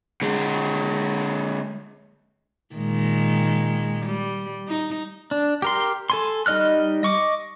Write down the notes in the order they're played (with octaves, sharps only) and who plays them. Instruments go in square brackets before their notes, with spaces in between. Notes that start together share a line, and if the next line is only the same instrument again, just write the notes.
[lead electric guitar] D3 G#3
[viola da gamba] A#2 D#3 G#3
G3
D#4
[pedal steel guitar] D4
G4 A#4 C6
A4 G#5 C6
G3 D#4 D#5 F6 F#6
D#5 C#6 D6